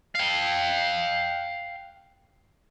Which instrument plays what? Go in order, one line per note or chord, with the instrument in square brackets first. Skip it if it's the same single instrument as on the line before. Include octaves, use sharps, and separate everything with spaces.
[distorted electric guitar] F5 G5